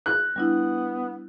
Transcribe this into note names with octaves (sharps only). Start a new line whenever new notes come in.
F#6
G3 B3 D4 E4